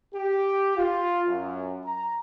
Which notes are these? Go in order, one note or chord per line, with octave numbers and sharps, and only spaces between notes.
G4
F4
F#2
A#5